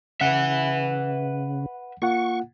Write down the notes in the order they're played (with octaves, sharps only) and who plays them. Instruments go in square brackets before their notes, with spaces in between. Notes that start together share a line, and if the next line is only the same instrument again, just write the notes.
[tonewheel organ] C#3 [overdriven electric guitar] B4 E5 [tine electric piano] F#5
[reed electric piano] A#3 F4 F#5 [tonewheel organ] C#6